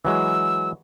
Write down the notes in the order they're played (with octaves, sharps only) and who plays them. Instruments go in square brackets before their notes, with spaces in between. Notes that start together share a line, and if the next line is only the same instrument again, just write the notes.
[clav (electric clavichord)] E3 F#3 G#3 [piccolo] E6